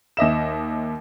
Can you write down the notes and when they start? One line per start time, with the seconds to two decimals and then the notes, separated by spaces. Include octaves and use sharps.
0.17 D#2 D#5 E5 E7